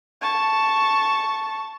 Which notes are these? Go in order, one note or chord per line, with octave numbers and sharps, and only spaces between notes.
A5 C#6